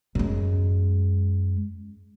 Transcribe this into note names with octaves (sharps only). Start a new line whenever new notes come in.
F#2 G#3